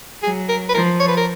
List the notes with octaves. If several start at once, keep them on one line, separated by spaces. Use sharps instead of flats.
F#3 G#4
A#4
B4
F3 A#4
C#5
B4
A#4